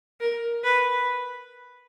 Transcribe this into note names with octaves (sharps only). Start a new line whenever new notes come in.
A#4
B4